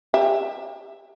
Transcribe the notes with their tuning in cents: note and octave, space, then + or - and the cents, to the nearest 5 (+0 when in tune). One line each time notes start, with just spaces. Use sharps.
G4 +30 E5 +0